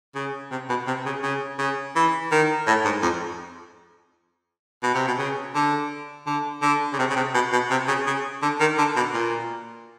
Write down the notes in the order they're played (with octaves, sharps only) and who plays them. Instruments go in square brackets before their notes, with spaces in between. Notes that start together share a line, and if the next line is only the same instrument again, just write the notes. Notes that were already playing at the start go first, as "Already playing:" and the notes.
[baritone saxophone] C#3
C3
B2
C3
C#3
C#3
C#3
E3
D#3
A2
G#2
F2
B2
C3
B2
C#3
D3
D3
D3
C#3
C3
C#3
C3
B2
B2
C3
C#3
C#3
D3
D#3
D3
B2
A#2